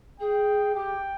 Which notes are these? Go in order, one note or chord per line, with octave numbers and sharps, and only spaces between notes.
G#4 G5
G4 G5